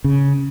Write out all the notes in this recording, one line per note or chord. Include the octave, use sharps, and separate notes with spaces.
C#3